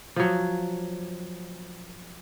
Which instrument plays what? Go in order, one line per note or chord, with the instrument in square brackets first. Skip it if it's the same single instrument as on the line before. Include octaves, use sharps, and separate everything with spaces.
[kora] F3 F#3